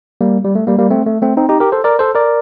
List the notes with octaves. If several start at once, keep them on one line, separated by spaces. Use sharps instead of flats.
G3 A#3
G3
A3
G3 A#3
G3 A#3
A3 C4
A3
A3 C4
C4 D#4
D#4 G4
G4 A#4
A4 C5
A#4 D5
A4 C5
A#4 D5